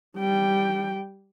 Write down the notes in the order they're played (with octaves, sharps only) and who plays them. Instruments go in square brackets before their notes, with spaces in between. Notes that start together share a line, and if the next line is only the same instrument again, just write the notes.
[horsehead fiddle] G3 G5